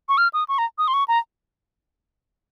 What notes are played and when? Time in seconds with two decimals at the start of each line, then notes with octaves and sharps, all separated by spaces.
0.09 C#6
0.18 F6
0.33 D#6
0.48 C#6
0.58 A#5
0.78 D#6
0.88 C6
0.94 C#6
1.08 A#5